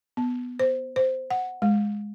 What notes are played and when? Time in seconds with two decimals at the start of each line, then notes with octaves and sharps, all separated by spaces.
0.17 B3
0.60 C5
0.96 C5
1.31 F#5
1.62 G#3